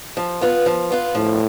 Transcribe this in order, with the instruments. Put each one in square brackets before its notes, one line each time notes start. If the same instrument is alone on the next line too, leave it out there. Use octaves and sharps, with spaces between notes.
[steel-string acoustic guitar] F3
B3 F4 B4
F3
B3 F4 B4
[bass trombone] A2 [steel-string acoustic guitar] F3